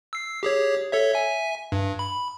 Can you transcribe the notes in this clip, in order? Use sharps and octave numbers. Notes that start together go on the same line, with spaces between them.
E6 C7
G4 G#4 C#5
A4 C#5 E5
E5 G#5
G2
B5